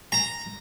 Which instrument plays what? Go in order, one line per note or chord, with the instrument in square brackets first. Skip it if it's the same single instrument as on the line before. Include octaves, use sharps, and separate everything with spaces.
[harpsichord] A#5